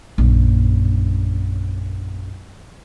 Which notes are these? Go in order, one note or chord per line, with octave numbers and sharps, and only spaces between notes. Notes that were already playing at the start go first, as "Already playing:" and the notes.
A#1 F#2